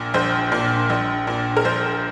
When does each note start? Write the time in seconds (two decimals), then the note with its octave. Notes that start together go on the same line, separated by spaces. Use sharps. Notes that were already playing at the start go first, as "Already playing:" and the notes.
Already playing: A#1 A#2
0.14 A#1 C5
0.52 A#2
0.90 A#1
1.27 A#2
1.57 A#4
1.65 A#1 C5